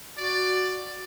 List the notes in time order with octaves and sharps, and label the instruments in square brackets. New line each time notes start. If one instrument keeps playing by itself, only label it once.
[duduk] F#4 [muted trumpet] D5